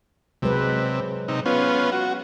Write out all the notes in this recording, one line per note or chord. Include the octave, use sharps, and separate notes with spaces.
C3 F#3 G#3 B4
C3 D#4
B3 C#4 F4
F#4